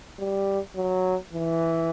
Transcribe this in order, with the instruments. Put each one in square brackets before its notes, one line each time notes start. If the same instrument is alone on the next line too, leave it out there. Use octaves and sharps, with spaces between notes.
[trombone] G3
F#3
E3